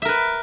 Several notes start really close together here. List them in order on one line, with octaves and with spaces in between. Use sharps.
E5 A#4 B4